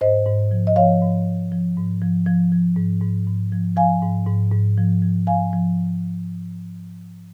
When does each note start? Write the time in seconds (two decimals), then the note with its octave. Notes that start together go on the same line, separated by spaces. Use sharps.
0.01 G#2 C5 D#5
0.26 G#2
0.51 F3
0.67 D#5
0.76 F3 C#5 F5
1.02 G#2
1.26 G#2
1.52 F3
1.77 G#2
2.02 F3
2.27 F3
2.52 F3
2.77 G#2
3.01 G#2
3.27 G#2
3.52 F3
3.76 F3 F5 G#5
4.02 G#2
4.27 G#2
4.52 G#2
4.78 F3
5.03 F3
5.27 F3 F5 G#5
5.53 F3